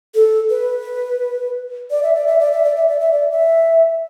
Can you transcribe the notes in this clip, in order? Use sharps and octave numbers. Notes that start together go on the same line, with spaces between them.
A4
B4
D5
E5
D5
E5
D5
E5
D5
E5
D5
E5
D5
E5